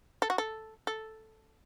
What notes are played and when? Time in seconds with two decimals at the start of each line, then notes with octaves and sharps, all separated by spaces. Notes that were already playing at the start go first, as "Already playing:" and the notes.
0.22 A4
0.30 F#4
0.38 A4
0.87 A4